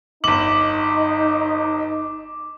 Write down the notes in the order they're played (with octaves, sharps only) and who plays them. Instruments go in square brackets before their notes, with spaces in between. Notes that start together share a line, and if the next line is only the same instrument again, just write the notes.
[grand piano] G1 F#7 [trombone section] D#4 [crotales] D6